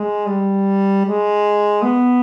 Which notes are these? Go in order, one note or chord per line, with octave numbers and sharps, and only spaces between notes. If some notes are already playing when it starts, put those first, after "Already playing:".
Already playing: G#3
G3
G#3
B3